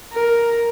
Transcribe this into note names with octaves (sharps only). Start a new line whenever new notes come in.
A#4